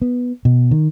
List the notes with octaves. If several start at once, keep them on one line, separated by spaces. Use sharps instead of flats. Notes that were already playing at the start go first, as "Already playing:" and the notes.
B3
B2
D#3